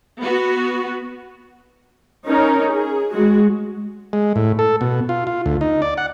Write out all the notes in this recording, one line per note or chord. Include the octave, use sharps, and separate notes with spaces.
B3 F#4
C#4 D#4 A#4
G#4
G#3 F#4
G#3
A2
A4
B2
F4
F4
D2
D#4
D5
F#5